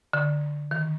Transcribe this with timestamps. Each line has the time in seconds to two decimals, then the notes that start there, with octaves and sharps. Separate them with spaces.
0.13 D3
0.71 D#3